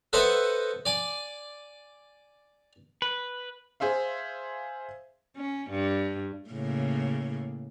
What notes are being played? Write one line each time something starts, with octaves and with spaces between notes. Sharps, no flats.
A4 B4 C5 D#5 E5 F#5
D5 G#5
B4
G#4 C5 E5 F5
C#4
G2
A2 C#3 A#3